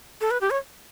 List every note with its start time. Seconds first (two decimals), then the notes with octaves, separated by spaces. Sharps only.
0.21 A4
0.31 B4
0.41 G4
0.51 C#5